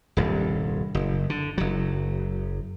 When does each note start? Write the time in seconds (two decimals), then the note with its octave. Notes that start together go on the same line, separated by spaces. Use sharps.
0.17 D#1 C2 G2
0.95 F#1
1.30 D3
1.58 F#1 F#3